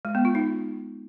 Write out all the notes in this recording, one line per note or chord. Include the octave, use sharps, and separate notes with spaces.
G#3
B3
F4
D#4